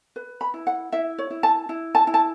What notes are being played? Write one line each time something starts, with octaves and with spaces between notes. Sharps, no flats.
B4
B5
E4
F#5
E4 E5
C#5
E4
A5
E4
A5
E4
A5